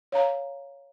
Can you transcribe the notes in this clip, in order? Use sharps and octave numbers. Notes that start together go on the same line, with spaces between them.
C#5 F5 A#5